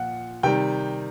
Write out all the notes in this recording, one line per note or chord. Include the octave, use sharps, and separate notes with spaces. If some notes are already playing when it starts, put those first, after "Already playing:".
Already playing: A#2 F3 F#5
C3 D#3 G3 G5